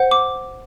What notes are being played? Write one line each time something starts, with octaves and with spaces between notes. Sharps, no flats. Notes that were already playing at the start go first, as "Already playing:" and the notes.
Already playing: C5 F#5
D6